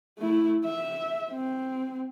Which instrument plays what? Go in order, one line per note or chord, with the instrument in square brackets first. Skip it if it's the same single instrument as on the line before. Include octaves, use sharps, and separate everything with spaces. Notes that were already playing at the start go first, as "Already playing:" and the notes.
[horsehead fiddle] A3 E4
E5
C4